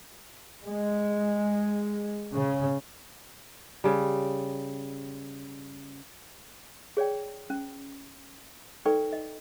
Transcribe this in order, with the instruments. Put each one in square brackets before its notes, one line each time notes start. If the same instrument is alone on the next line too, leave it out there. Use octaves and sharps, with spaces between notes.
[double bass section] G#3
C#3
[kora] C#3 G3
[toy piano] G#4 C#5 D5 G5
C#4
D#4 A4 B4 D5 G5 C#6
D#5